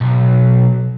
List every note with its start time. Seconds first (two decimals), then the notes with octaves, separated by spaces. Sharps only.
0.01 B1